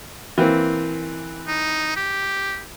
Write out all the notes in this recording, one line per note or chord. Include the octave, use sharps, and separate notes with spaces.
E3 A#3 C4
D#4
G4